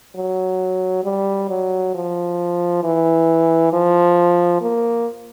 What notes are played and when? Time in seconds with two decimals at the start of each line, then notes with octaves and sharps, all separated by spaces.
0.16 F#3
1.04 G3
1.50 F#3
1.95 F3
2.84 E3
3.73 F3
4.61 A#3